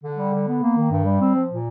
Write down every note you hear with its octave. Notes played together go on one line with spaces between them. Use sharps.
D3
G3
D3
B3
A#3
D#3
G2
G3
C4
F3
A#2